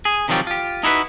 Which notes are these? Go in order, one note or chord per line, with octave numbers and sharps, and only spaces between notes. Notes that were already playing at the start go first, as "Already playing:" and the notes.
G#4
C3 D#3 F3 F#3 F4 G4
F4 G4
D#4 E4 F#4 G#4 B4